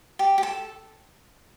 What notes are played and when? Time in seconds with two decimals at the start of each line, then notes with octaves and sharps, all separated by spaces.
0.19 G4
0.38 G4
0.43 A4